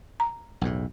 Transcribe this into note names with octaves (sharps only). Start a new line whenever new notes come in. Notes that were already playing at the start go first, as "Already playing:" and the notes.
A#5
B1 E2 A2